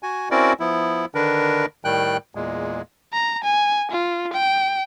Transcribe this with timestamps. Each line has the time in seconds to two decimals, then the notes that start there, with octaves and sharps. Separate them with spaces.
0.03 F#4 G#5
0.31 C4 C#4 E4 F#4 A#4 D5
0.60 F3 B3 E4
1.15 D3 D#3 D4 A#4 B4
1.85 A2 D#3 G3 G5 F#6
2.35 E2 A#2 G#3
3.13 A#5
3.44 G#5
3.91 F4
4.33 G5